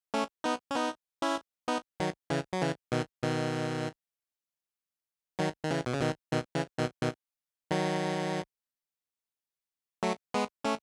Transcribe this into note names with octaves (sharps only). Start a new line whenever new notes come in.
A3 C#4
B3 D#4
C#4
B3 D#4
C#4 E4
B3 D#4
D#3 F#3
C#3 E3
F#3
C#3 E3
B2 D#3
B2 D#3
D#3 F#3
D#3
C#3 E3
B2
C#3
B2 D#3
B2 D#3
C#3 E3
B2 D#3
B2 D#3
D#3 F#3
F#3 A3
G#3 B3
A3 C#4